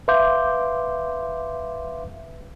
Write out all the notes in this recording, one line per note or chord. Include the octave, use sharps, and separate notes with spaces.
B4 E5 F5 C6 D6 G6